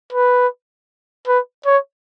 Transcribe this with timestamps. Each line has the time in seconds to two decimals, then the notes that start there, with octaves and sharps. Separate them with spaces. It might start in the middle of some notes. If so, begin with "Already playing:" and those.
0.13 B4
1.28 B4
1.66 C#5